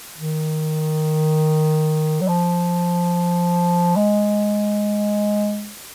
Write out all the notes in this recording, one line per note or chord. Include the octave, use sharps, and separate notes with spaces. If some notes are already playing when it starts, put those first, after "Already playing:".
D#3
F#3
F3
G#3